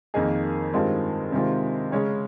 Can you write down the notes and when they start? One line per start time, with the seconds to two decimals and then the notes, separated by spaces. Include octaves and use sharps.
0.14 F2 D#3 A#3 D#4 G#4
0.73 G2 D#3 G#3 C4 F4
1.32 C3 D#3 G#3 C4 F4
1.92 C#3 G#3 C#4